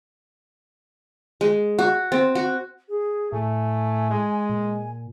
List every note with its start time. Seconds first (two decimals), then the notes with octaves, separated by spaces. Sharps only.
1.41 G#3
1.79 F#4
2.12 C4
2.35 F#4
2.89 G#4
3.32 A2 A3 G#5
4.10 G#3
4.49 A#2